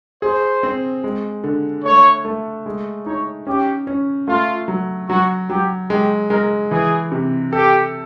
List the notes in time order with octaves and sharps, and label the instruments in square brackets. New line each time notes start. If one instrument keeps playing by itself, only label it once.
[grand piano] G#4 [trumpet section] C5
[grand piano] C4
G#3
D3
[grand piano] A3 [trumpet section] C#5
[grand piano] A3
G#3
[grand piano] D#4 [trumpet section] C#5
[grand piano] C#4 [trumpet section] G4
[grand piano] C#4
[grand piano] A3 [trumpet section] F4
[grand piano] F#3
[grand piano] F#3 [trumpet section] F#4
[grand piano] F#3 [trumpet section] G4
[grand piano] G#3 [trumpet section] G4
[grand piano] G#3 [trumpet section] A#4
[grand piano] E3 [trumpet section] G#4
[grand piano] C3
[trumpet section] G4 [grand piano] A4